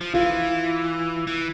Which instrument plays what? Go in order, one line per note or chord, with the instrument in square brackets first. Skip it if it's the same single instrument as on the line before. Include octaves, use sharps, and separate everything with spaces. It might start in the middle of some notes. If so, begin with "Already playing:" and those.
[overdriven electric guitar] F3
[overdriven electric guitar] E3 [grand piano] F4
[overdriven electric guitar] E3